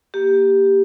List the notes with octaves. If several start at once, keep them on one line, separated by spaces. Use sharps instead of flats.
A#3 G4